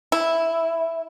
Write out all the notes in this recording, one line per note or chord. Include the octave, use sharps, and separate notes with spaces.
E4